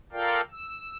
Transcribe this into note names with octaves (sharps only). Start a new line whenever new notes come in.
F4 A4 A#4 D5 F5 G5
E6